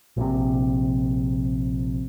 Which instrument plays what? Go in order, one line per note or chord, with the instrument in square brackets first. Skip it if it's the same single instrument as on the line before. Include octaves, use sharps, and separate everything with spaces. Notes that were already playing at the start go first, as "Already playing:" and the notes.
[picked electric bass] A#1 C3